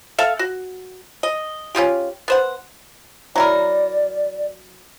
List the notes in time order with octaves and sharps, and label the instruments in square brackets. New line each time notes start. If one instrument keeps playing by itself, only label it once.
[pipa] A4 E5 F5
F#4
D#5
C#4 D#4 F4 G4
B3 C5 F#5
[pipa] F#3 E4 A#4 [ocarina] D5